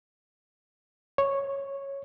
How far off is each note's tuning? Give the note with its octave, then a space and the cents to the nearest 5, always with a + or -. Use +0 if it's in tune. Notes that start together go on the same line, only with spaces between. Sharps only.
C#5 -5